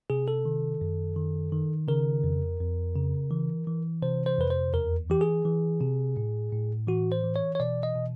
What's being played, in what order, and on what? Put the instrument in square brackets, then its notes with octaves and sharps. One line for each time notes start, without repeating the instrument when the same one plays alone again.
[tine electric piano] C3 G#4
A4
D#3
F#2
D#3
D#3
C#3 A#4
F2
F2
C#3
E3
E3
C3 C5
C5
F2 B4
C5
E2 A#4
E3 G4
G#4
E3
C3
A2
A2
E3 F#4
C5
E3
C#5
C#5
B2 D5
D#5
B2